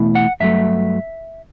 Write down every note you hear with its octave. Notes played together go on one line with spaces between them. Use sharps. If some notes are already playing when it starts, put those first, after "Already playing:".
Already playing: E2 B2 A3 E4
F#5
G2 F#3 A3 E5